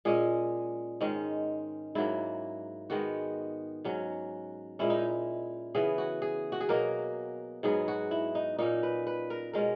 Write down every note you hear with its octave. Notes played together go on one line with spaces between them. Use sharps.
A#2 G#3 C#4 G#4
G#2 D#3 G#3 C#4
G#2 F#3 A#3 E4
D#3 G#3 B3 F#4
G#2 F#3 C#4
A#2 G#3 C#4 E4
D#4
E4
C#3 E3 B3 G#4
F#4
G#4
F#4
G#4
B2 F#3 A#3 A#4
G#2 F#3 B3 G#4
F#4
E4
D#4
A#2 A#3 C#4 D#4
B4
B4
A#4
B2 G#3 C#4 A#4